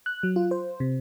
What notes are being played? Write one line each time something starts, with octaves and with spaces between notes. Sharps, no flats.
F#6
F#3
F4
C5
C3